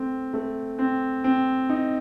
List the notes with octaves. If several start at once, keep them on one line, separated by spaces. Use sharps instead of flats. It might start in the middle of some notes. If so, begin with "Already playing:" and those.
Already playing: A3 C4
A3
C4
C4
D#4